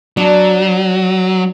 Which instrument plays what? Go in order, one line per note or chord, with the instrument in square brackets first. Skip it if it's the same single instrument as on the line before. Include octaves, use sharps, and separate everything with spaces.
[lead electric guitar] F#3 [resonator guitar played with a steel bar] D4